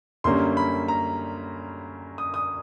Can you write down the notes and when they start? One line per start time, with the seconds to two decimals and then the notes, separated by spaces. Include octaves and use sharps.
0.24 F#2 D3 G3 A#3 C#4 C6
0.57 B5
0.88 A#5
2.18 D#6
2.34 D#6